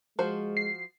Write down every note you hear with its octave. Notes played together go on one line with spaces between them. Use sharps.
F3 G#3 F#4 C5
C7